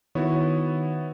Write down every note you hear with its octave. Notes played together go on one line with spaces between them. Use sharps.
D#3 B3 E4 F#4 C#5